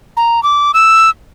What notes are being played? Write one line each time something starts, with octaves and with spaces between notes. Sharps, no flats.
A#5
D6
E6